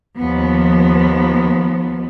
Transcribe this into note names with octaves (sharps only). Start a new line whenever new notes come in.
D#2 F3 B3